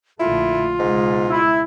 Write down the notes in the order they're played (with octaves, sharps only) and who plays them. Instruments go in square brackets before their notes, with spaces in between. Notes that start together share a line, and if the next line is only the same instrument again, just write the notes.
[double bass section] A#1 D3 A3 [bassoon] E4 [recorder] F4
[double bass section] C#2 B2 G#3 [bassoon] G#2
[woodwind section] E4